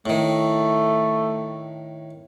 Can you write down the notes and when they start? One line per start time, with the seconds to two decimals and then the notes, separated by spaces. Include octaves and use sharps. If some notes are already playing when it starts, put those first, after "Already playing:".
0.06 A2 D#3 A3